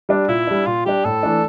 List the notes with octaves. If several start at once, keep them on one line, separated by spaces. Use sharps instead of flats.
G3 D4
A#2 E4
G3 D4
A#2 F4
G3 D4 G4
A2 A4
E3 A3 D4